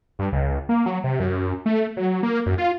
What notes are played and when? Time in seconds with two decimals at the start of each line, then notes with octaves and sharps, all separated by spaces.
0.19 G2
0.32 C#2
0.69 A#3
0.86 F#3
1.04 C3
1.20 F#2
1.66 A3
1.97 F#3
2.23 A#3
2.46 F#2
2.58 F4